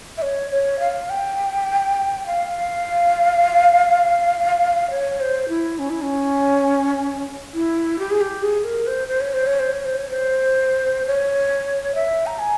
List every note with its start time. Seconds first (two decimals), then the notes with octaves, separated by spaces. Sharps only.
0.17 E5
0.22 C#5
0.51 C#5
0.80 F5
1.10 G5
2.26 F5
4.90 C#5
5.20 C5
5.49 E4
5.79 C#4
5.90 E4
6.02 C#4
7.54 E4
7.99 G4
8.10 G#4
8.21 G4
8.43 G#4
8.64 A#4
8.87 C5
9.08 C5
9.21 C#5
9.33 C5
9.47 C#5
9.59 C5
9.72 C#5
9.85 C5
9.97 C#5
10.10 C5
11.06 C#5
11.95 E5
12.26 A#5
12.39 G#5